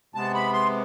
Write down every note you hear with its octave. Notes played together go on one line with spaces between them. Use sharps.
C3 G#3 B3 A5
B5
C6